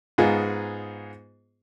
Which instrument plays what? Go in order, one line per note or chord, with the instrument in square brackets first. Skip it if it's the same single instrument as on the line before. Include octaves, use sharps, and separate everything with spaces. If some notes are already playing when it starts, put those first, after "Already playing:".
[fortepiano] G#2 B3 D#4 F4 G#4